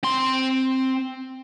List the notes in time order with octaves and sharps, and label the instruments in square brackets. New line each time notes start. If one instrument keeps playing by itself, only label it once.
[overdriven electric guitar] C4 C6